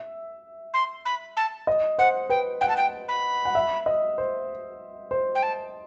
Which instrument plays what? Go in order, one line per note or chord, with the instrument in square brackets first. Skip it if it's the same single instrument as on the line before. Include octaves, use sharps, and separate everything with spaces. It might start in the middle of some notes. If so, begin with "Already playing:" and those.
Already playing: [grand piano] E5
[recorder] C6
B5
A5
[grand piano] D#5
[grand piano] C5 [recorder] F#5
[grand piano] B4 [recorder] G5
[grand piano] F#5 [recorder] G5
[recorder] A5
G5
B5
[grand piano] F#5
E5
D#5
C5
C5
[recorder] G5
A5